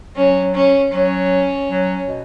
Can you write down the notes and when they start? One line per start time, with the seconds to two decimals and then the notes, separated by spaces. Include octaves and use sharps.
0.16 F#3 C#4
0.54 C#4
0.92 F#3 C#4
1.70 F#3
2.08 B2